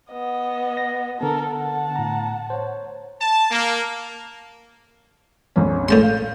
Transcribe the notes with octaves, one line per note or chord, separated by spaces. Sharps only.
B3 D#5
A#6
D3 B3 A4 A#4
F#5 A5
A2 A#5
C5 C#5
A5
A#3
A#1 F2 C#4
A2 G#3 A5 C6 G6
F5